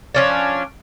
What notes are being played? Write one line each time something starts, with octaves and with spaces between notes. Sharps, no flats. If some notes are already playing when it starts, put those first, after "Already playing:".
F3 C#4 D4